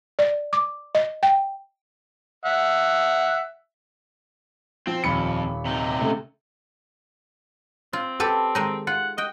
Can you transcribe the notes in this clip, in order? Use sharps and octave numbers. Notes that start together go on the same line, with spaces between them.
D5
D6
D#5
G5
E5 F#5
F3 C4
D#1 F2 B5 C#7
C3 D#4
C#3 A3
C4 F4
G4 A4 B4
D#3 G#3 D#4
F4 F#5
F#4 D#5 G5